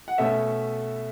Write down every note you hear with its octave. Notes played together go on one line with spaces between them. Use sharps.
F#5
B2 A3 C#4 E5